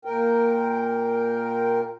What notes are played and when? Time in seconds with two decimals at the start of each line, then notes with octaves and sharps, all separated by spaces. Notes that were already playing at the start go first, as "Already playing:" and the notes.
0.05 A#2 A#4 G5